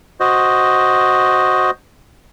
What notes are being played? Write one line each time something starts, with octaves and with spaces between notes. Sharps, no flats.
F#4 C5 D#5